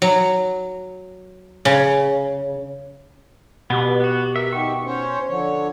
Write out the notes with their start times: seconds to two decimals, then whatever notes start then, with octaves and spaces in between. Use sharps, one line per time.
0.02 F#3
1.65 C#3
3.70 B2 B3 G4
4.00 B3 F#4
4.36 A#4 E5
4.53 D#3 G4 F#5 C#6
4.86 C#4 C5 C#5
5.29 D3 F3 C#5